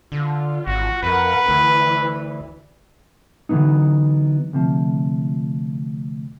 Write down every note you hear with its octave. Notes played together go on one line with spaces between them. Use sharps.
D3 F4
G#1 F#4
F2 A#4 B4 F#5
D2 E3
D3 E3 F#3 B3 D#4
D2 C3 F3